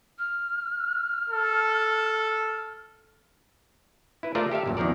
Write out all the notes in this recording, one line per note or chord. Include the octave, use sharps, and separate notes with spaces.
F6
A4
E4 B4
A3 F4 A#4 C5 D5 F5
G4 A4 E5 F5
A1 F#2 A#2
E2 D#3 F3 A#4 D5